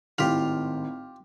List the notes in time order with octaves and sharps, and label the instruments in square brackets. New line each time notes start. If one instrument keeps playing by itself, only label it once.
[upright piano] G#1 A2 F7 [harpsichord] F4 G4